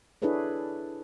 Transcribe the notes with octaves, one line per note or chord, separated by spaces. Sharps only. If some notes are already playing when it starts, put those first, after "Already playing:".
D4 E4 G#4 A4 B4 C#5